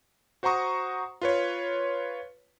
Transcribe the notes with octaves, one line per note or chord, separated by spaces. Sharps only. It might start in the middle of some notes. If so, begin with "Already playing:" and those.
F#4 C5 F#5 A#5 C#6 D#6
F4 B4 C#5